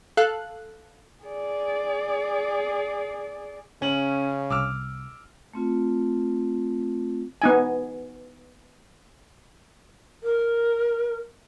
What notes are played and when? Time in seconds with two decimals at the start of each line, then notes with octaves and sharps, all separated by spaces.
0.17 A4 F5 F#6
1.24 G#4 D5
3.82 C#3 C#4 F#7
4.50 C2 D6 E6 F6
5.53 A3 C4 F4
7.42 B3 D#4 G#5
10.23 A#4